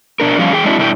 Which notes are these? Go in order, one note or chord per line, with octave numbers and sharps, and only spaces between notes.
B2 D4 A#4
F3 G3 C#4 D4 F5
E2 G#4 G5
G#3 C4 D4 E4 F#4
G2 B2 D4 E4 G4 G5